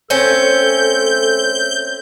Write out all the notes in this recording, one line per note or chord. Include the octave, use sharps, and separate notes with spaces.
A3 C4 C#4 A4 G6